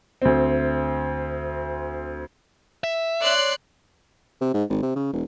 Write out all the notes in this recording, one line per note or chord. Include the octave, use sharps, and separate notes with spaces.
D2 C4
E5
C#5 D5 C6 F#6
C3
G#2
G#1
C3
C#3
E1